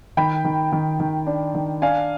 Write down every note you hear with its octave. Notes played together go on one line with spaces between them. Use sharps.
D#3 G5 B5
D#3
D#3
D#3
D4
D#3
D4 F5 G#5